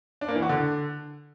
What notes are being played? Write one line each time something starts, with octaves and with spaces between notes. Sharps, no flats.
D4
A#3
E3
F#4
D3